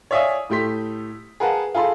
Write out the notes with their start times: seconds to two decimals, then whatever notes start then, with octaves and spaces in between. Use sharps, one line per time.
0.11 C#5 D5 E5 F5 G#5 D#6
0.50 A2 A3 G4 C6 B6
1.40 G#4 A#4 B4 F5 F#5 A5
1.75 F4 G#4 A4 B5 C6